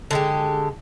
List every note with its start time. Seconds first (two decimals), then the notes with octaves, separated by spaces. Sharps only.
0.11 D3 G#3 G4